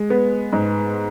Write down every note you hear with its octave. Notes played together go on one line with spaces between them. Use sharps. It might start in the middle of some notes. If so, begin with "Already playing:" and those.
Already playing: G#3
B3
G#2